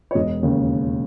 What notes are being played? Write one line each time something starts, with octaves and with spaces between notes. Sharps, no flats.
C#5
E1 D#5
D#2 C#3